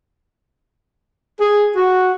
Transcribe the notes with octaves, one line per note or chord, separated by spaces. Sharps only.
G#4
F#4